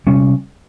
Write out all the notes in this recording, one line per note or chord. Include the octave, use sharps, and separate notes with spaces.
C3 G3 C#4